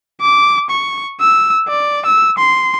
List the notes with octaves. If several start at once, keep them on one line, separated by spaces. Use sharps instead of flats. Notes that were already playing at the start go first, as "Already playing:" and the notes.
D6
C#6
E6
D5
E6
C6